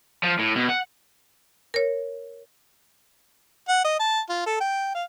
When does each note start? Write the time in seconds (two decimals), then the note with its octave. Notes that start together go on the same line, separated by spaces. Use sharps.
0.23 F3
0.39 A2
0.56 B2
0.69 F#5
1.74 A#4 C#5
3.69 F#5
3.85 D#5
4.00 A5
4.30 F4
4.46 A4
4.61 G5
4.95 F5